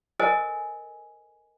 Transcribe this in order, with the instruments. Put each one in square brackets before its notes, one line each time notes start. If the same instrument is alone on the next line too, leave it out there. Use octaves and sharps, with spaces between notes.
[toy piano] A4 A#4 C5 D#5 G#5